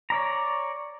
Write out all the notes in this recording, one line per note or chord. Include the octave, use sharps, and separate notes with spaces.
C#5 D5 A#5